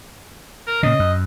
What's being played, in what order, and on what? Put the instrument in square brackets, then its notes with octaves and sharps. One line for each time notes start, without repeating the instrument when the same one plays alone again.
[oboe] A#4
[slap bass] A#2 C#3 [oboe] D#5
[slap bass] F#2